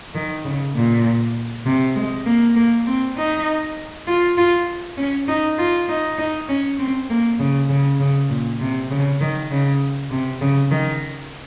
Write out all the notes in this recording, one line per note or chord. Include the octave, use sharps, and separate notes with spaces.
D#3
C#3
A#2
C3
G#3
A#3
A#3
C4
D#4
F4
F4
C#4
D#4
F4
D#4
D#4
C#4
C4
A#3
C#3
C#3
C#3
A#2
C3
C#3
D#3
C#3
C3
C#3
D#3